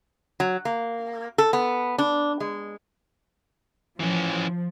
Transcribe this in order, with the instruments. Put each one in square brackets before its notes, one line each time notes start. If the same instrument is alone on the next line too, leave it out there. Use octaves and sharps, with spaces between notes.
[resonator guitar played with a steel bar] F#3
A#3
A4
B3
D4
G#3
[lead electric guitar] E3 C#4 [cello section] F3